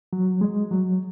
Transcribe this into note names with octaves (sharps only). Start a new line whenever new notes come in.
F#3
G#3
F#3